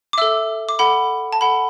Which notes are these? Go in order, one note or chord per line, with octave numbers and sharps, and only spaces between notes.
D6
A4 E5 E6
D6
A4 F#5 B5
A5
A4 F#5 B5